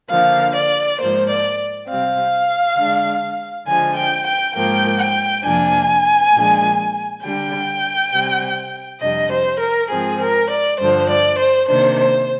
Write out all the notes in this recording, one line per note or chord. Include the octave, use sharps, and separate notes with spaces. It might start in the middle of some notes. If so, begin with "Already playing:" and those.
D3 F3 A#3 F5
D5
G#2 F3 A#3 C5
D5
C3 G3 C4 F5
D3 G#3 D4
D3 F3 G#3 G#5
G5
G5
G#2 F3 A#3 G5
G5
F2 C3 F3 A#3 D4 G#5
A#2 F3 G#3 D4
D3 G3 D4 G5
C3 G3 C4
F2 C3 G3 D4 D#5
C5
A#4
G#2 F3 C4 G#4
A#4
D5
G2 D3 F3 C5
D5
C5
C3 D#3 A#3 D4 C5
C5